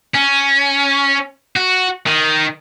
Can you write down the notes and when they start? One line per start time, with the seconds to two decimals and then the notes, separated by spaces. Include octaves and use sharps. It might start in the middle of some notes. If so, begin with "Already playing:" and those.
0.14 C#4
1.57 F#4
2.06 D#3